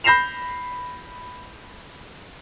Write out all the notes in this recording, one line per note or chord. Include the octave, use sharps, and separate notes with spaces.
B5 G6 A#6 C7 E7 F7